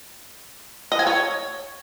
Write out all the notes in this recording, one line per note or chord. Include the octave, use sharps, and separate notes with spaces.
D#5
G#5
C#5